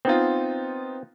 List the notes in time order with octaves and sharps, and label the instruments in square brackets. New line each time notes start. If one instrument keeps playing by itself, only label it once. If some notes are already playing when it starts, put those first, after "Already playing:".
[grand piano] B3 D#4 F4 [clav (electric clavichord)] C4